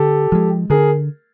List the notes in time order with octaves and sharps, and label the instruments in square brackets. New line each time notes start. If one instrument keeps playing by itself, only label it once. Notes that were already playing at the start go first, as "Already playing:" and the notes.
Already playing: [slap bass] D3 [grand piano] G4 A4
[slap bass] F3 G#3
[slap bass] D3 [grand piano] G#4 A#4